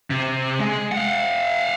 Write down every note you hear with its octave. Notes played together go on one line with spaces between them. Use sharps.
C3
G#3
F5 F#5